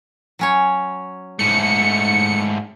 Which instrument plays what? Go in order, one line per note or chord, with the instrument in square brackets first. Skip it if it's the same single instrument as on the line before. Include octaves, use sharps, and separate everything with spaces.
[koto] F#3 C#4 C#5
[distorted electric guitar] G#2 A3 [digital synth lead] C#7